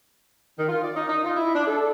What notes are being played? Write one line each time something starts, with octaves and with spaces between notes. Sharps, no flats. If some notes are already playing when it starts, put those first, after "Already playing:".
D#3
F4
D5
D#4
D#4
F4
E4
D4
A4